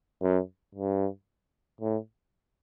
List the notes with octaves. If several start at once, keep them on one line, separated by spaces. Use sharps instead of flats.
F#2
G2
A2